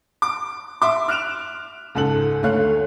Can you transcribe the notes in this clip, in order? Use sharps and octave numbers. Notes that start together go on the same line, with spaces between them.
D6
E5 C6 D6
F6 F#6 D7 E7 F7
C#2 G#2 A4 F#6 F#7
D2 A3 C#5 F5 F#6